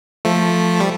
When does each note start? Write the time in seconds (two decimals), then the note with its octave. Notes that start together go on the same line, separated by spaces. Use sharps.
0.25 F3 A3
0.80 G3